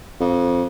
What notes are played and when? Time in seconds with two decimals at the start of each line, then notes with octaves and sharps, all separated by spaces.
0.21 F2